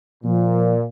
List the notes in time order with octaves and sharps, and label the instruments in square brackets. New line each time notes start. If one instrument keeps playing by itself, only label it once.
[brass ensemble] A#2 [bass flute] F3